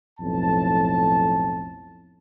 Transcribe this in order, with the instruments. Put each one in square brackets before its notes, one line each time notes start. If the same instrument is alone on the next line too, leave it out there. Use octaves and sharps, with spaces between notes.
[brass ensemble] B1 F2 A2 A5